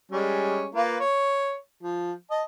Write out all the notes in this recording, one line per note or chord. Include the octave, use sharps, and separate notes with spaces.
G3 G#3 C#4
A#3 F4 B4
C#5
F3
D#5 A5